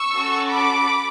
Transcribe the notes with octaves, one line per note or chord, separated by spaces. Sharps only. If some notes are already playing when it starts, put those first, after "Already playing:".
Already playing: C#6 E6
C#4 F#4 A4
B5 D6